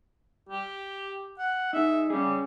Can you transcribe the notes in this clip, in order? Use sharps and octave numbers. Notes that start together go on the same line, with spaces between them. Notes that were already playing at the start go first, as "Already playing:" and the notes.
G4
F#5
D#4 G#4 E5
G3 C#4 G#4